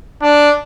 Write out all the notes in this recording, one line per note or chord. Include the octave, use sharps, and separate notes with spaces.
D4